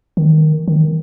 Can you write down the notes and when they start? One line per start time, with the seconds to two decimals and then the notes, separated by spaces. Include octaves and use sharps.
0.17 D#3
0.68 D#3